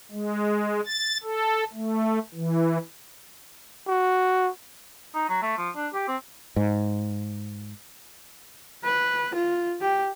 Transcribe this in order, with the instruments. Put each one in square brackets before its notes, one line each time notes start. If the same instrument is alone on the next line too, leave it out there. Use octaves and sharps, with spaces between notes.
[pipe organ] G#3
A6
A4
A3
E3
[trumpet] F#4
[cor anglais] D#4
F#3
A3
F3
D4
G4
C4
[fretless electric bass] G#2
[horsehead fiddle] B4
F4
G4